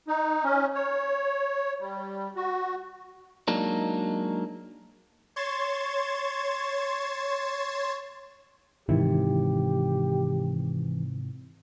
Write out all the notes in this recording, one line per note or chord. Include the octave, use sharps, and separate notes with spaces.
D#4
C#4
C#5
G3
F#4
F#3 G#3 A#3 D4 D#4
C#5 C6 G#6 A6 E7
G#2 C3 D#3 E3 E4 G4